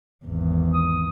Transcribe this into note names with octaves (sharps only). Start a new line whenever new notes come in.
G#1 E2
D#6